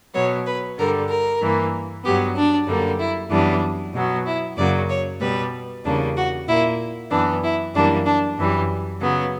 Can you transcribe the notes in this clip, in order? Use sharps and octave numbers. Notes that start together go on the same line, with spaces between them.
B2 F#3 B3 C#5
B4
G2 D3 G3 A#4
A#4
G2 E3 A#3
G2 F#3 B3 G4
D4
F#2 D3 G3 A#3
E4
F#2 E3 G3 B3 D4
B2 F#3 B3
E4
F#2 C#3 F#3 A#3 D5
C#5
B2 G3 B3 B4
E2 C#3 G3 A#3 D4
F#4
A#2 A#3 E4
F#2 E3 B3 D4
E4
F#2 E3 G3 A#3 D4
D4
F#2 E3 G3
C#3 F#3 B3